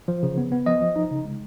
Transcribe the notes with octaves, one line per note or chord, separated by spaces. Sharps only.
F3
C#3
B3
B3
F3 D#5
F3
D#4
C#3
G#3